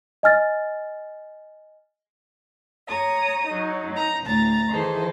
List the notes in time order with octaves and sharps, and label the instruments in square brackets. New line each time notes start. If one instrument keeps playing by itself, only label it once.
[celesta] D#5 G#5 F6 A6
[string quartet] C#5 A#5 D#6
F#3 D#4
D#4 A#5
D2 A2 A#5 A6
D#3 E3 G#4 A4 C5